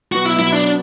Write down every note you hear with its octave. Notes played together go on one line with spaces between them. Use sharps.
B2 F#3 B3 F#4
E4
E4
D4